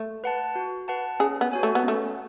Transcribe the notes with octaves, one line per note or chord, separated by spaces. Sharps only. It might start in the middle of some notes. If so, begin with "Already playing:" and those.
Already playing: A3
B4 F#5 A5
F#4
B4 F#5 A5
C#4 G#4
B3
F#4 C#5 G#5
A3
B3
A3 C#4